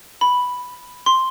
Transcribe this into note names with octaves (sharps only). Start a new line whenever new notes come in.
B5
C6